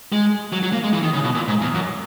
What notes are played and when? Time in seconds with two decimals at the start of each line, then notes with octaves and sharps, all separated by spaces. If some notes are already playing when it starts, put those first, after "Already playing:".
0.12 G#3
0.53 F#3
0.63 F#3
0.73 A#3
0.84 G#3
0.93 E3
1.03 D#3
1.13 C#3
1.24 B2
1.35 A#2
1.48 G#2
1.61 E2
1.74 F#2